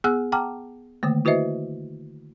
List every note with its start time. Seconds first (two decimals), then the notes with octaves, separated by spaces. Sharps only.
0.04 B3 G#4 F#5 E6 F#6
0.32 F#5 G5 A5 A#5 D6 F6
1.03 D3 D#3 A3 A#3
1.25 E4 F#4 B4 C5 D#5 E5